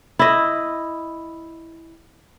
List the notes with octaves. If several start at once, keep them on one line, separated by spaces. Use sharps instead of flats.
E4 D#5